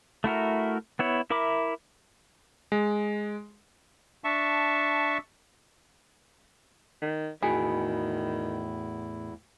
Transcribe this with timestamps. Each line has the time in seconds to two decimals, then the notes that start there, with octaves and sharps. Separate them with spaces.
0.24 A3 E4 F#4 A#4
0.99 B3 E4 C#5
1.30 E4 A#4 E5 B5 D6
2.72 G#3
4.24 D4 E5 A5 C#6
7.02 D#3
7.43 E2 A2 D#3 E4 F#4 G#4 B5